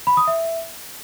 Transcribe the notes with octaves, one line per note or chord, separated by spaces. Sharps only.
B5
D#6
E5